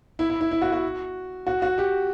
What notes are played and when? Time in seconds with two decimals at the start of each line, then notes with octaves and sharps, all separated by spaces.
0.19 E4
0.30 E4
0.41 E4
0.51 E4
0.62 F#4
0.72 F#4
1.47 F#4
1.62 F#4
1.78 G4